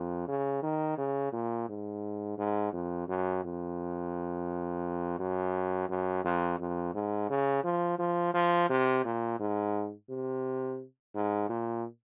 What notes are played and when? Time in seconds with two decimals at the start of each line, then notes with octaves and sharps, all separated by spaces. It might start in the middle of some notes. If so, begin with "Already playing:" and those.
Already playing: F2
0.28 C#3
0.62 D#3
0.97 C#3
1.33 A#2
1.69 G#2
2.38 G#2
2.73 F2
3.08 F#2
3.44 F2
5.19 F#2
5.89 F#2
6.24 F2
6.59 F2
6.94 G#2
7.30 C#3
7.64 F3
7.99 F3
8.34 F3
8.69 C3
9.05 A#2
9.39 G#2
10.10 C3
11.15 G#2
11.49 A#2